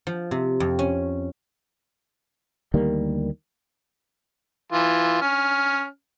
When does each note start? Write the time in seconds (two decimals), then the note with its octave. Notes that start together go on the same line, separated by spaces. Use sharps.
0.07 F3
0.31 C3
0.60 F2
0.79 C#4
2.74 D2 D#3 G3 A#3
4.72 E3 F4
5.22 C#4 F6